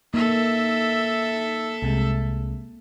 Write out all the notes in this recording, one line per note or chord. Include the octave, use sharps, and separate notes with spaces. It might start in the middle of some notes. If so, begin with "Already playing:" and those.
A#3 D#4 A4 E5
C2 C3 G#3